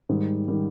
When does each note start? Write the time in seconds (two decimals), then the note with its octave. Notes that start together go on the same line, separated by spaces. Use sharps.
0.09 G#2 D#3 G3
0.48 D#3 G3